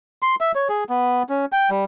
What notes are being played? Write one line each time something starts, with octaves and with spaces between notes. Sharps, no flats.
C6
E5
C#5
G#4
B3
C#4
G5
G3